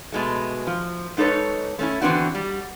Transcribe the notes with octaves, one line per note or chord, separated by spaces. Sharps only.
B2 G#3 A3
F3
G#2 D#4 A4 B4 C#5
A3 C#4 E4
D3 E3 B3 C4 D4 F#4
G3